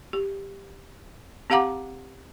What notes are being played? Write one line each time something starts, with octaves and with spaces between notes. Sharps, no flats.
G4
C4 G4 F5 F#5 A#5 D6